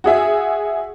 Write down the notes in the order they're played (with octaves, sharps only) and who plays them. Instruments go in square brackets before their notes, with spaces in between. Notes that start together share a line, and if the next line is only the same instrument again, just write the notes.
[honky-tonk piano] F#4 G#4 E5